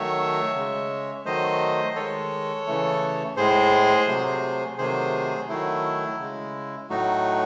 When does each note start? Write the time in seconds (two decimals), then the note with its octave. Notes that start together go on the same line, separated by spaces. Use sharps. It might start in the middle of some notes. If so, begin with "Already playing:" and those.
Already playing: D#3 F#3 A3 C#5 E5
0.55 C#3 G#3
1.25 D#3 F#3 A3 C5 D#5
1.95 D#3 G#3 A4 C#5
2.66 C#3 E3 A3
3.37 A2 G#3 G#4 C5
4.07 C3 F#3 A3
4.78 C3 D#3 F#3 A3 G#4 C5
5.48 D#3 F#3 A3 E4
6.19 C#3 G#3
6.89 A2 F#3 A3 D#4 F#4